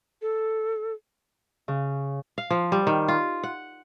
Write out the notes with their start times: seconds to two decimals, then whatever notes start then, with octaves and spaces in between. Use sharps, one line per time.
0.22 A4
1.68 C#3
2.38 F5
2.50 F3
2.72 G3
2.87 D#3
3.08 F4
3.43 F#5